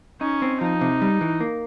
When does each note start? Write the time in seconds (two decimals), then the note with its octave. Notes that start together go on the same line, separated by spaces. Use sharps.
0.21 C#4 D#4
0.42 C4
0.61 F3 D#4
0.81 C3
1.01 G3
1.21 E3
1.40 A#3